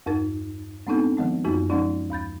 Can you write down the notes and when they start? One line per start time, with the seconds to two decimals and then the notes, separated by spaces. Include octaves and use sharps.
0.06 E2 G2 D#4 A#4 A6
0.87 G#3 B3 C4 D4 D#4 A4
1.17 D#3 F3 G#3 B3
1.45 F#2 F#3 A#3 D#4 F#4
1.69 F3 G#3 C#4 D#4 D5
2.10 D#2 B5 G6 A6